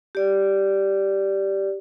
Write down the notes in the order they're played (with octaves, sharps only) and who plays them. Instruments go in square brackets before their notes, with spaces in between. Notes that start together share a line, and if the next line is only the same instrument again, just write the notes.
[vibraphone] G4 D5